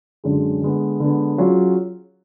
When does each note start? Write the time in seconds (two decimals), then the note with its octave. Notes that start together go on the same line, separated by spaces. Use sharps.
0.24 F#2 D3 G#3 C#4 G#4
0.62 D3 G#3 B3
1.00 D3 G#3 B3
1.38 F#3 C#4 F4 G#4